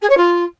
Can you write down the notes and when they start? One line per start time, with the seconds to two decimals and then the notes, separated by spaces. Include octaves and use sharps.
0.01 G#4
0.09 C#5
0.17 F4